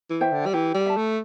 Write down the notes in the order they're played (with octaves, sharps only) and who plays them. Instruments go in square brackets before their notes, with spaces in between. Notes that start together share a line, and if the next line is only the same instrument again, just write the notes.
[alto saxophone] E3
[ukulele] C5 E5 G5
[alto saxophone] D3
G3
[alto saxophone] E3 [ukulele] G4
[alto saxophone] G3
[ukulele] E5 A5
[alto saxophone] A3